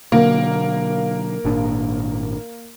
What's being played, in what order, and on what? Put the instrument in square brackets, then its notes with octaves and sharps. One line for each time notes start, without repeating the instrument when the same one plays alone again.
[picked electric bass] B2 D3 F#3 [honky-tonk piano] A#3
[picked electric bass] G#1 A#2 D4